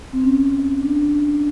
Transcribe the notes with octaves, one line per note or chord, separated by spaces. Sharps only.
C4
C#4
D4